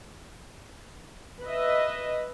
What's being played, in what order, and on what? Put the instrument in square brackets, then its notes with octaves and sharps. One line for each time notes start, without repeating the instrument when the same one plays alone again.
[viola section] B4 D#5 E5